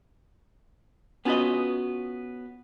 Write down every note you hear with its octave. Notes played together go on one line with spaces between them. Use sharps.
B3 C#4 F4 F#4 B4 D#5